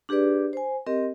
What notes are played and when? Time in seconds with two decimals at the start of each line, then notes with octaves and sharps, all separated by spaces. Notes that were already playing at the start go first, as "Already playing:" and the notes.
0.09 D4 G4 G#4 B4 D5
0.53 C5 G#5
0.86 C4 G4 A#4 D#5